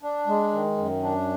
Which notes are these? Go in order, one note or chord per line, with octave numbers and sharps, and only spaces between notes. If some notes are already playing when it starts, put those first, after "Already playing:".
D4
G#3
D#3
F#2
D4